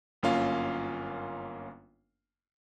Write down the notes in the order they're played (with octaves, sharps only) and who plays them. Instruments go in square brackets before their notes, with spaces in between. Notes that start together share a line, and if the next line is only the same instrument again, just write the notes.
[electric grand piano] G1 F#2 A#3 C#4 F4 F5